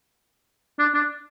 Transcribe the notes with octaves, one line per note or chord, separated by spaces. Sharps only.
D4
D4